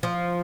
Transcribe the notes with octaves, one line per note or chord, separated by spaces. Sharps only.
F3